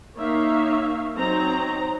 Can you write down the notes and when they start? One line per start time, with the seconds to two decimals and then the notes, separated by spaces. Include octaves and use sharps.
0.16 A#3 D#4 C#5 E5 F5
1.17 F#3 C4 D#4 A#5